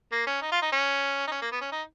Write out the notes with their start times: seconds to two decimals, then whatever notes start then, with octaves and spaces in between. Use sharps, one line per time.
0.12 A#3
0.27 C#4
0.41 D#4
0.52 F4
0.62 D#4
0.72 C#4
1.27 D#4
1.31 C#4
1.41 A#3
1.52 B3
1.61 C#4
1.72 D#4